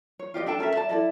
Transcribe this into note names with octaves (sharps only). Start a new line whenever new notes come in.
C#5
F4 G4 D5 D#5
D4 A4 G5 A5
C#4 A4 A#4 E5
D5 E5 A5
E4 A4 D5 D#5